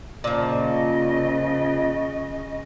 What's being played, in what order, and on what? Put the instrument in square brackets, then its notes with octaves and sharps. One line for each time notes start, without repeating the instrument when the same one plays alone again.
[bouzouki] A#2 F3 [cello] C#3 D#5